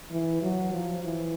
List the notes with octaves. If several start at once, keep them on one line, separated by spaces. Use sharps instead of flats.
E3
F#3
F3
E3